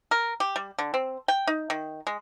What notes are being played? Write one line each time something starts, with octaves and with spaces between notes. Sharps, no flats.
A#4
G4
G3
D3
C4
G5
D#4
D#3
G#3